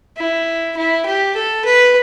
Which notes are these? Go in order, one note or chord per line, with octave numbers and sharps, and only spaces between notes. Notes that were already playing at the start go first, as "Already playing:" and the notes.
E4
E4
G4
A4
B4